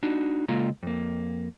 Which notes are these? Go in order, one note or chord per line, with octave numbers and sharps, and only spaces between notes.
D4 D#4 F#4
C#3 G#3 A#3 F4 A4 A#5
F2 A#3